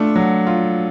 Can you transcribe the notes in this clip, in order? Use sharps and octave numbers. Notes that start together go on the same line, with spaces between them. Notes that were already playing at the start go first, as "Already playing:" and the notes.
Already playing: A3 D4 F4
F#3
F4